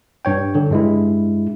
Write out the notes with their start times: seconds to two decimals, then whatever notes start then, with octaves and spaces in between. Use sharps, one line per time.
0.25 G2 C#5 G5
0.55 D3
0.70 G2 G#3 E4